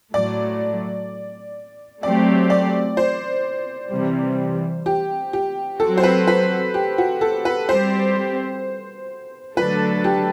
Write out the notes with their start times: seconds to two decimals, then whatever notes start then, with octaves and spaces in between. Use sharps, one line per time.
0.14 A2 F#3 A3 D5
2.03 F#3 A3 C4 G4 D5
2.50 D5
2.97 C5
3.92 C3 E3 G3
4.86 G4
5.33 G4
5.80 F#3 C4 F#4 A4
5.97 C5
6.03 B4
6.28 B4
6.74 G4
6.98 F#4
7.21 A4
7.45 B4
7.69 G3 C4 G4 C5
9.57 D3 F#3 A3 D4 A4 B4
10.04 G4